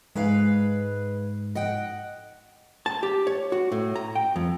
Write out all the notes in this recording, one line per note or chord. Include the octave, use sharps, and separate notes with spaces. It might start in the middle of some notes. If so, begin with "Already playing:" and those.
G#2 G#3 B4 F5
D#5 F#5 G5
A5
G4
C#5
F#4
A2
A#5
G5
F2